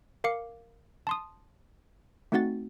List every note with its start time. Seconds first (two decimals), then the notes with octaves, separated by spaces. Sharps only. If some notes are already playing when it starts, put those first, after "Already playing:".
0.24 A#4 F5 D6 C#7
1.07 A5 C6 D#6
2.32 A3 C4 D#4 F#4 F#5 A6